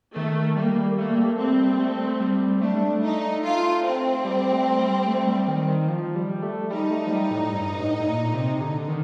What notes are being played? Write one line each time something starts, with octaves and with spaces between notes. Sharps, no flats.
D#3 A3
G3 A#3
A3 A#3
G3
A3
C4
G3
A3
G3
A3 D4
G3
A3
D#4
F4
C4
G3
A3
G3
A3
G3
D#3
D#3
F3
G3
A3
G3 D#4
A3
F3
G3
A2
G2
A2
A2
A#2
C3
D3
D#3